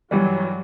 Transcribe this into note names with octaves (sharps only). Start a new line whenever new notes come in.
G2 E3 F#3 G3